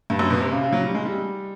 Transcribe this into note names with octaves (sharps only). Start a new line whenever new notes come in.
G2
F#2
B2
C3
C#3
C#3
F#3
G3
G#3
G3